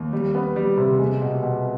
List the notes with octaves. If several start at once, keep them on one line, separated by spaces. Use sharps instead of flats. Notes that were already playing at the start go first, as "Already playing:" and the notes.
Already playing: D#2
G3
B3
G3
C3
G#3
B2
B2